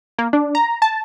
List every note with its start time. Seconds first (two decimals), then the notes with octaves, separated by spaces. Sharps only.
0.18 A#3
0.33 D4
0.55 A#5
0.82 A5